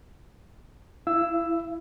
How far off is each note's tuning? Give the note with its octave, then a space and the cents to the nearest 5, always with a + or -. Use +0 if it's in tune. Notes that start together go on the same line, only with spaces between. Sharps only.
E4 +10 F5 -40 E6 +5